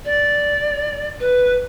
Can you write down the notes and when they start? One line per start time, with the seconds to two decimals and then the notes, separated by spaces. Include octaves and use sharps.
0.05 D5
1.20 B4